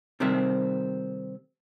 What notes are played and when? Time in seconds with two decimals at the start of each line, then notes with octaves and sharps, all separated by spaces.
0.20 C3 D#3 G3 A3 C4